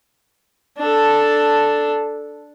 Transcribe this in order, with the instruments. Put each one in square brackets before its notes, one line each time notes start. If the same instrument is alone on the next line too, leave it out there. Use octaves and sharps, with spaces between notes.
[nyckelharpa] D4 A4